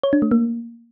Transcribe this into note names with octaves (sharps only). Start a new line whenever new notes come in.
C#5
D4
A3
A#3